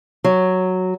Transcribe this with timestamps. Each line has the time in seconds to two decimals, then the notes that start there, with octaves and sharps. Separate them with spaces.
0.24 F#3